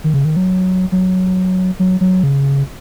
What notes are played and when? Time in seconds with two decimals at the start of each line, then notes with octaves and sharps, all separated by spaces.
0.04 D#3
0.14 C#3
0.25 D#3
0.36 F#3
0.92 F#3
1.79 F#3
2.01 F#3
2.23 C#3